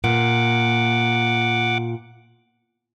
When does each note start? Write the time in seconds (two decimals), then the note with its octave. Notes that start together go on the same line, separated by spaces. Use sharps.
0.04 A#2 F#5 D6